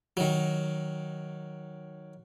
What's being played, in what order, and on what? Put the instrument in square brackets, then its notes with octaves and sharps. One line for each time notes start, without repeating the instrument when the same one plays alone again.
[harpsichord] D#3 F#3